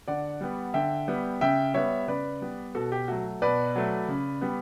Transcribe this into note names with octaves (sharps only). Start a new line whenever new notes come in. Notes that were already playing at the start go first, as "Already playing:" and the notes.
D3 D5 F#5
G3 B3
D3 E5 G5
G3 B3
C#3 E5 G5
G3 B3 C#5 E5
C#3 B4 D5
G3 B3
B2 F#4 A4
G4
F#3 A3 F#4
B2 B4 D5
F#3 A3
C#3
G3 B3